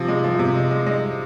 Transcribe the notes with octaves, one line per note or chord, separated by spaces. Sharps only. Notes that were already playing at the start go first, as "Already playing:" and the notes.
Already playing: C3 F3
G#3
F3
C3
G#3
G#3
G#3